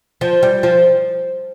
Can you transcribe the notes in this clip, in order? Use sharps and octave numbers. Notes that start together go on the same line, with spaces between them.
F3
G3
F3